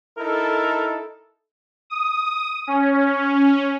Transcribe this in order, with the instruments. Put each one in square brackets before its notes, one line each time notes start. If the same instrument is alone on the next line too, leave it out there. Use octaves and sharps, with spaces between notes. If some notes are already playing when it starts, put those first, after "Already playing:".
[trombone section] D#4 E4 A4 [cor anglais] A#4
[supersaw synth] D#6
C#4